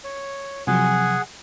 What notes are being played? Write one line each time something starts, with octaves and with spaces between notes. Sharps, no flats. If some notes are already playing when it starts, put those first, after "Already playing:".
C#5
C3 F3 F#3 G#4 F#5 G#5